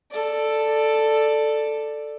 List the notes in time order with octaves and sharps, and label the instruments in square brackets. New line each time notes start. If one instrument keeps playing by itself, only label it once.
[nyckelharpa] A4 D5